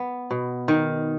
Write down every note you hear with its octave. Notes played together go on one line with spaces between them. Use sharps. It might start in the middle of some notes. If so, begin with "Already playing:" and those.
Already playing: B3
B2
D#3